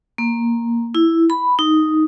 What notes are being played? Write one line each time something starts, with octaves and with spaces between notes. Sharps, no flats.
A#3
E4
B5
D#4